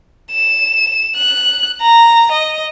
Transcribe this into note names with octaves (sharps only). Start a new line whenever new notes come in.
E7
F#6
A#5
D#5